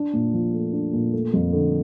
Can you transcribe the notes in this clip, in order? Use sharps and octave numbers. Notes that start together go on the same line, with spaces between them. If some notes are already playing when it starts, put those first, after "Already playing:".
Already playing: D4
A#2
F3
A3
D4
A#2
A3
F2
D3